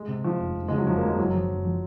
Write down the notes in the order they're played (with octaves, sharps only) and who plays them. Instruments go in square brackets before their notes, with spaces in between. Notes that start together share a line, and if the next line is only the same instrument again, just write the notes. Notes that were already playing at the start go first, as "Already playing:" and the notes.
Already playing: [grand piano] G#3
[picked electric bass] C3
[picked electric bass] C3 [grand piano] F3
[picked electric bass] F1
F1
[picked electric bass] C#3 [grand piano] G#3
[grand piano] F#3
[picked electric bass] F1 [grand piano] F3
[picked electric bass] F2 [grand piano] A#3
[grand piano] G#3
[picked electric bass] F#1 [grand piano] F#3
[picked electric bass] F3
F#1
F3